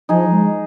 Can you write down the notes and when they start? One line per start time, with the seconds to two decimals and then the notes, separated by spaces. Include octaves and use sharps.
0.09 F3 D#4 G#4
0.31 G#3